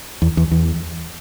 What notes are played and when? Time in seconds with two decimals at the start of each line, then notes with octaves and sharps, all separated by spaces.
0.22 E2
0.37 E2
0.51 E2